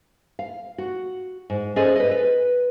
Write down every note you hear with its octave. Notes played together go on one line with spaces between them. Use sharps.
F5
F#4
G#2
C#4 G#4 A4 C5 D5 D#5
B4 D#5
B4